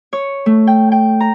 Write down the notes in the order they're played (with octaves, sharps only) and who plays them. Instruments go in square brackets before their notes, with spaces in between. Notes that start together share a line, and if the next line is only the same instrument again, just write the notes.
[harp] C#5
A3
G5
G5
A#5